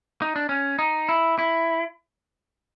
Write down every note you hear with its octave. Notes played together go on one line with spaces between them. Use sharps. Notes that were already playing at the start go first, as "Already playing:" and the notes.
D#4
D4
C#4
D#4
E4
E4